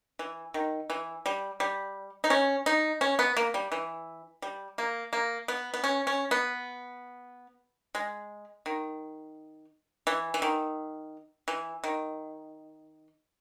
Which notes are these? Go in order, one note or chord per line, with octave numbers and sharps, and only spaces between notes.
E3
D#3
E3
G3
G3
D#4
C#4
D#4
C#4
B3
A#3
G3
E3
G3
A#3
A#3
B3
B3
C#4
C#4
B3
G#3
D#3
E3
E3
D#3
E3
D#3